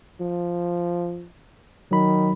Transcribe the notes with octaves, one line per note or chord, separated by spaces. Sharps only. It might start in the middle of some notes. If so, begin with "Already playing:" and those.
F3
D#3 F#3 B5